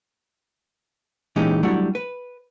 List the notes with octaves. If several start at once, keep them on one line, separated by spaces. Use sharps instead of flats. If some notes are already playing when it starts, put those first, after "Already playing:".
A#2 E3 G#3 C#4 D#4 G4
F#3 G3 A3 D4 E4 F#5
B4